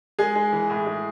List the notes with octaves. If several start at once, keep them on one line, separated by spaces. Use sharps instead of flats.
G#3 G#4
G#3
E3
A2
G#3